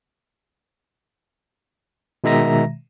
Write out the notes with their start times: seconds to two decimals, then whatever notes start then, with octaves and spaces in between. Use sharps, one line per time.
2.24 B2 D#3 G#3 E5 A#5 A#6